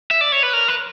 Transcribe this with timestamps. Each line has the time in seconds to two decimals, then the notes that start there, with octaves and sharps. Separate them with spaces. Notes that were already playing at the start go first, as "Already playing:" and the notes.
0.11 E5
0.21 D5
0.32 C#5
0.43 B4
0.53 A#4
0.68 B4